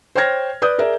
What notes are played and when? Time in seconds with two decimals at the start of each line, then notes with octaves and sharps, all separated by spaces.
0.15 C5 C#5 G5 F6 G#6 A#6
0.62 B4 D5 D#6 G6
0.78 G#4 A#4 D5 E5